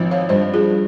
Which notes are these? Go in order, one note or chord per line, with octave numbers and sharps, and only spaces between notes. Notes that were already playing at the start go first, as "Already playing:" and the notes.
Already playing: G#1 F3
C#5 F5
G2 C5 D#5
F4 G#4